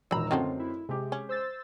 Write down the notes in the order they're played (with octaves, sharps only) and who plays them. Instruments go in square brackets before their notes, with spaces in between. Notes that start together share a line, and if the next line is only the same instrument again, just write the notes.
[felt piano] E1 D#3 [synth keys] A#2 A#5 E6 [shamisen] F#3 B5
[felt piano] F#2 C4 [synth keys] D3 F4 [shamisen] D#3 F#3 A3
[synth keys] E4
[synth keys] C3 [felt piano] G#3 G4
[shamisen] C#4
[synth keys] C5 E6 A6